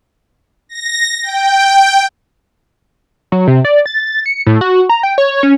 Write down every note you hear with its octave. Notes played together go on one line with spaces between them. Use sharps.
A#6
G5
F#3
C3
D5
A6
C#7
A2
F#4
A#5
G5
C#5
C#4